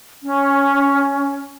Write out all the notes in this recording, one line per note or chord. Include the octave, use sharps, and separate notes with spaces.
C#4